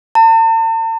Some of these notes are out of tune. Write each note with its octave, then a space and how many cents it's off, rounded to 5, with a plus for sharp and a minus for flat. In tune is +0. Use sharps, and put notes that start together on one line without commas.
A5 +45